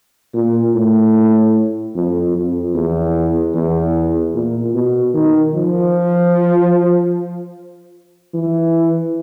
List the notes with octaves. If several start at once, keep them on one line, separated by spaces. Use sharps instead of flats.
A#2
A2
F2
F2
E2
E2
A#2
B2
D#3
F3
E3